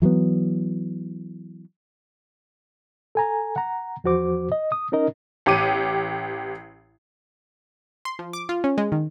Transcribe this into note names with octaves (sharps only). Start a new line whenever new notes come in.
E3 F#3 G#3 B3
A4 G#5 A#5
F#5 A#5
E2 F3 F#4 C5 D6
D#5
D#6
C#4 D#4 A#4 D#5
A1 G4 D6 D#7
C6
F3
D6
F4
C#4
G#3
D#3